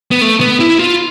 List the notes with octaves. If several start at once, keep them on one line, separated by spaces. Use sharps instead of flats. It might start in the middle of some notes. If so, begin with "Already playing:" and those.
B3
A3
B3
E4
F4